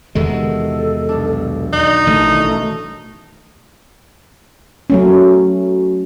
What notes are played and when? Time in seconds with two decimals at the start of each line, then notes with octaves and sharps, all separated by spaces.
0.15 E2 C3 D#3 G#3 F#4 A4 E5
1.09 B1 D4
1.73 D#4 D5
2.07 A1 D#3 A3 D#7
4.90 F#3 A3 C#4